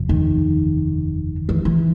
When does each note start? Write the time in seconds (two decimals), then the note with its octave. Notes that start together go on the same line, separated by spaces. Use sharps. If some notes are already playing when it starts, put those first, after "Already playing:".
Already playing: F#1 E2 C3 F3
0.09 D#3
1.49 E3
1.65 E3